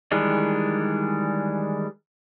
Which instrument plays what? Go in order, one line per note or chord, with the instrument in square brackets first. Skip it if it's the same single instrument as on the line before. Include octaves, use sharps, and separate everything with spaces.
[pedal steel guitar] D#3 E3 G3 G#3 D4